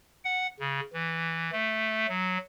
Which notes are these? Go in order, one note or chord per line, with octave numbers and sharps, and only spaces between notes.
F#5
C#3
E3
A3
F#3